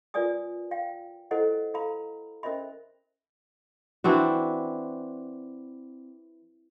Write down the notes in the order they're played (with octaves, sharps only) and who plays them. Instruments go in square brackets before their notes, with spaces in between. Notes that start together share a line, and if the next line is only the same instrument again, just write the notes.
[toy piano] F4 A#4 B4 D5 G#5 D#6
F5 G5
E4 A4 C5 D#5 F#5
A4 F5 A#5 B5
C#4 A#4 C5 D#5 E5 B5
[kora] E3 C4 D4 F#4